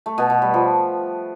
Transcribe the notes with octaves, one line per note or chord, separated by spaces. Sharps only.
A3
B2
B2
G3
F3